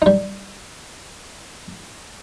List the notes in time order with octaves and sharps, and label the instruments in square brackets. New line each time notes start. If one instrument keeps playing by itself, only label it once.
[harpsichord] G3 D#4